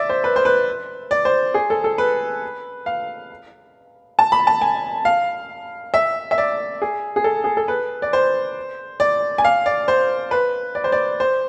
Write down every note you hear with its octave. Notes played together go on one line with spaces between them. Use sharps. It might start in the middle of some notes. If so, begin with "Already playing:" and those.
Already playing: D5 E5
C5
B4
C5
B4
D5
C5
G#4
A4
A4
B4
F5
A5
B5
A5
G#5
F5
E5
E5
D5
G#4
G#4
A4
G#4
A4
B4
D5
C5
D5
G#5
F5
D5
C5
B4
D5
C5
D5
C5